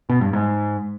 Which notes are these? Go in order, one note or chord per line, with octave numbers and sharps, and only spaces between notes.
B2
G2
G#2